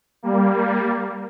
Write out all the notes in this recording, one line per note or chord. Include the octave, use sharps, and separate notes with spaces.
G3 A#3